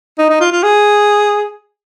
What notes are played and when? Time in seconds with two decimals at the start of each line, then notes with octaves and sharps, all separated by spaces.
0.18 D#4
0.29 D#4
0.40 F4
0.52 F4
0.63 G#4